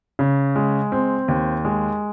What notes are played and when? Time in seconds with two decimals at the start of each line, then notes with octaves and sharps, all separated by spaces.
0.19 C#3
0.56 G#3
0.92 C4
1.28 D#2
1.65 G#3